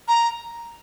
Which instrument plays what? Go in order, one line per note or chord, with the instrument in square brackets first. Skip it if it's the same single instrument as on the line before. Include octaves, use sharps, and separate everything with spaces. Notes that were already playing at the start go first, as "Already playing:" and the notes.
[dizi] A#5